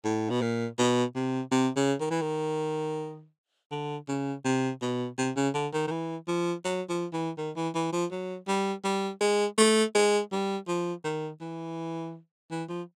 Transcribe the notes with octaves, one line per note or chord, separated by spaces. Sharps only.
A2
B2
A#2
B2
C3
C3
C#3
D#3
E3
D#3
D3
C#3
C3
B2
C3
C#3
D3
D#3
D#3
E3
F3
F#3
F3
E3
D#3
E3
E3
F3
F#3
G3
G3
G#3
A3
G#3
G3
F3
D#3
E3
E3
F3